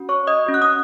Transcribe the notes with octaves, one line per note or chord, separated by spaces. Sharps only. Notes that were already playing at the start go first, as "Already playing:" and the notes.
Already playing: C#4 F#4
C#5 C#6
D#5 D#6
C#4 F#4
F#6
D#6